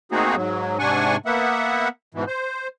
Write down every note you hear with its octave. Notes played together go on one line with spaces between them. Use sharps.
A3 A#3 C4 D#4 F#4 G#4
G#2 F#3
G#2 C3 D4 F#5 G#5 C#6
A#3 B3 E5 F#5
G#2 B2 E3
C5